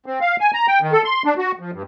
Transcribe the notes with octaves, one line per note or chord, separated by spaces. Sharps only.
C4
F5
G#5
A#5
G5
D#3
A4
C6
D4
F#4
F3
G2